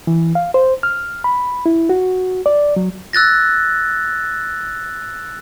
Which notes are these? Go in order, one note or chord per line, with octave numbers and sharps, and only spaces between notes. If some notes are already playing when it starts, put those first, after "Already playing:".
E3
F5
C5
F6
B5
E4
F#4
D5
F#3
E6 F#6 A6 A#6